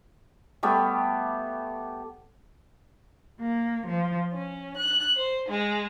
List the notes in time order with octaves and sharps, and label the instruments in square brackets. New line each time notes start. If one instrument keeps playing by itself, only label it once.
[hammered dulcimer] G3 A3 B3 G4
[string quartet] A#3
F3
C#4
F#6
C5
G#3